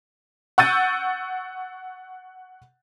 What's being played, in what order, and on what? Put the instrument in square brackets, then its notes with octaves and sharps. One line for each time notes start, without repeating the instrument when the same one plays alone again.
[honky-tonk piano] F#5 C#6 E6 G6 A6 D#7